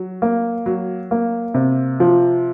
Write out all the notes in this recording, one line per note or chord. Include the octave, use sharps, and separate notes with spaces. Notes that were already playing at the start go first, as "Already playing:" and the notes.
Already playing: F#3
A#3
F#3
A#3
C3
F3